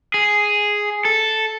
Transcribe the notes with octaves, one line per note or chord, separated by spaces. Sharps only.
G#4
A4